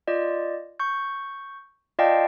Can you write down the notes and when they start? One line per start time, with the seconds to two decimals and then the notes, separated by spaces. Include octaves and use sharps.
0.07 F4 D5 D#5
0.79 C#6 G6
1.99 F4 D5 D#5 F5 G5 A5